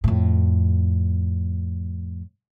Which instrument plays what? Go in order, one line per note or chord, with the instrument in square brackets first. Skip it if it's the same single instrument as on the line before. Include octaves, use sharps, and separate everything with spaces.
[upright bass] F2 A2